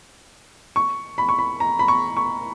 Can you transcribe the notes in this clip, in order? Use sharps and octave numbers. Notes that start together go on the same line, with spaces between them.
C#6
B5
C#6
B5
A#5
B5
C#6
C#6